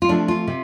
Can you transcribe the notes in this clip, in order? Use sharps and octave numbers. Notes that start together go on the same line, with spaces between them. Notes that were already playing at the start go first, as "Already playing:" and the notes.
F4
C3 F3 A3 D4
F4
C3